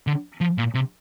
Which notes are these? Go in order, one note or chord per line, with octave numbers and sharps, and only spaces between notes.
D3
F3
A#2
C3